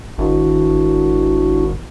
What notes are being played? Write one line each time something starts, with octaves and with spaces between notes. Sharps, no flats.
G#1 D4 E4 F#4